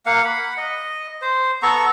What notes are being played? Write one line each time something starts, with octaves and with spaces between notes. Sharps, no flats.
A#3 F5 F#5
F#5 B5
D#5
C5
B3 A4 A#5 C#6